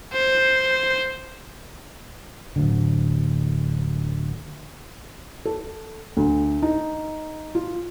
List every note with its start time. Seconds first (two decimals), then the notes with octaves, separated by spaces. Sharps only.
0.13 C5
2.56 D1 D2 D3
5.45 A4
6.17 D2
6.62 D#4
7.55 F4